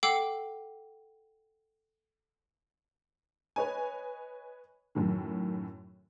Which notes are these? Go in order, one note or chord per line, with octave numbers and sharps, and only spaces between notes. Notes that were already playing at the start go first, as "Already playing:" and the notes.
A4 F#5 G5 D6 E6 C7
B4 C#5 D#5 G#5
F#2 A2 D#3